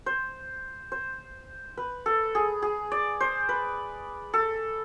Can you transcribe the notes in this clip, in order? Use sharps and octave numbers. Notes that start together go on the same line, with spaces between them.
C5
C5
B4
A4
G#4
G#4
D5
C5
B4
A4